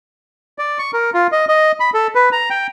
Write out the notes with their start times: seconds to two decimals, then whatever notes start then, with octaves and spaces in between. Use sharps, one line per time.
0.58 D5
0.79 C#6
0.93 A#4
1.14 F4
1.32 D#5
1.49 D#5
1.80 B5
1.94 A4
2.15 B4
2.32 A#5
2.50 G5